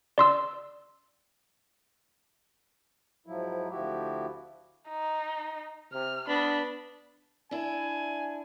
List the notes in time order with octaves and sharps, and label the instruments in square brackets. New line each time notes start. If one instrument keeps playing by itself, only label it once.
[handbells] D5 C6 E6
[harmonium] G#2 F3 F#3 E4
D2 F3 E4 F#4 G4
[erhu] D#4
[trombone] C3 [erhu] F6
[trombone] B3 [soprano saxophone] D4 [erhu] B5
[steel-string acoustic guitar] D4 E4 [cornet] G#5